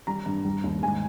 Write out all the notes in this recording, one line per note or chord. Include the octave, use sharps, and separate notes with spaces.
G3 A#5
G2
G3
D#2
G#2 G#5